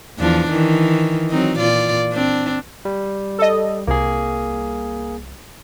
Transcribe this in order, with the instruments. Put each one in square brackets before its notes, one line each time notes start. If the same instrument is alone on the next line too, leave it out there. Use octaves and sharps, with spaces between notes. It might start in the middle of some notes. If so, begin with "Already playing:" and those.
[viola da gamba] E2 F3 D4
D#3 E3
F#3 C4 D#4
A#2 F4 D5
C4 D4
[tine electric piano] G3
[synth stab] A4 D#5
[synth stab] C2 [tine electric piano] A#3 G#4